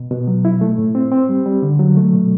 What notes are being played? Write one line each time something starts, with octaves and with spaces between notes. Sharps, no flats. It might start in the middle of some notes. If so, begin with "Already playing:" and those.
Already playing: B2
B2
F#3
E4
A3
A2
C4
C4
G3
G3
D3
F#3
A3
B2